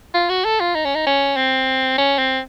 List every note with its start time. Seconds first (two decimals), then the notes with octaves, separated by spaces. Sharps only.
0.14 F4
0.29 F#4
0.45 A4
0.60 F4
0.75 D#4
0.85 C#4
0.95 D#4
1.06 C#4
1.36 C4
1.98 C#4
2.18 C4